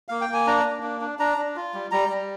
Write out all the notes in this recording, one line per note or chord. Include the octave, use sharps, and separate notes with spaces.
A#3 F5
G5
A#3 G#5
D4 A#5
A#3
D4
D4
D4 A#5
D4
F4
G3
G3 A#5
G3